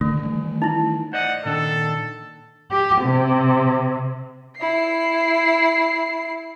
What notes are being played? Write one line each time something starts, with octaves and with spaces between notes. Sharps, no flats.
D3 D#3 A3 D4
D#3 E3 G3
D#4 E4
C5 D5 D#5 F#5
A#2 D#3 D4 A4
G4
C3
E4 C7